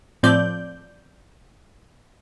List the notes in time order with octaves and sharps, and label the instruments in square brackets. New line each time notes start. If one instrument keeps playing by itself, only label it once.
[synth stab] A2 F3 C4 D5 G6